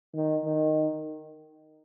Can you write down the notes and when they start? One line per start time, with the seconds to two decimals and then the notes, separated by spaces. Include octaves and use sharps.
0.15 D#3
0.45 D#3